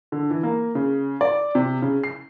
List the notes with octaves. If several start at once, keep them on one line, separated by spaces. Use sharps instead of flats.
D3
E3
A#3
C#3
D5
C3
C#3
C7